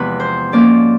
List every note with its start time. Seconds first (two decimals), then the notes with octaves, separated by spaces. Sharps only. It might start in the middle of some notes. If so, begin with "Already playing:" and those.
Already playing: E2 C3 F3 G#3 B3 B4
0.20 C5
0.52 G#2 F3 A#3 C#4 D5